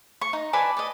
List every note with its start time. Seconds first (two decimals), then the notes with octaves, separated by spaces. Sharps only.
0.21 C#6
0.33 D#4
0.53 B4 D5 G#5 A5
0.77 D5 D#5